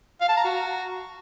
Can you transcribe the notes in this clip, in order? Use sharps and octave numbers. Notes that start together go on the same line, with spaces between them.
F5
A5
A#5
F#4